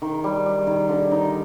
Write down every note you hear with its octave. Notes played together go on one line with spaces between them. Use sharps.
D#3
G3
G3
D#3
D3
D#4